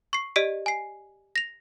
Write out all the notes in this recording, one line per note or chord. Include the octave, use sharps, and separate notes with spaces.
C#6 C7
G4 D5 D#5 B6 D7
G#5 C7
A#6 F7